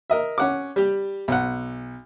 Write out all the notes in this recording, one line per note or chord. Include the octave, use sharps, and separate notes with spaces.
A#4 D#5 E5
C#4 F#5 D6
G3 G4
B1 F#5